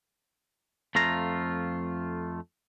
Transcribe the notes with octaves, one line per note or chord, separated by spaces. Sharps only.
F2 A3 F4 A#5